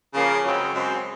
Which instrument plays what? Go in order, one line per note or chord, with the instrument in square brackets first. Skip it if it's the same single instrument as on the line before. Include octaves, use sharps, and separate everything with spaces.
[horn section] C#3 F3 A#3
F#2 C#3 G#3 C4 C#4
F#2 C#3 G#3 C4